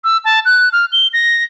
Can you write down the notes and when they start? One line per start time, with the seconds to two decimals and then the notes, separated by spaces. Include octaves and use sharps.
0.04 E6
0.25 A5
0.45 F#6
0.72 F6
0.92 G7
1.13 A#6